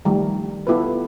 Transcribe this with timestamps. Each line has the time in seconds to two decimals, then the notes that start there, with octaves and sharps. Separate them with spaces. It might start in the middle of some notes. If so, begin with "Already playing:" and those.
0.05 D#3 F3 G3 A3
0.67 B3 E4 F4 A4 B4